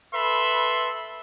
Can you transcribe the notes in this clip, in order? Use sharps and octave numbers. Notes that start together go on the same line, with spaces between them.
A4 B4 E5 B5 C6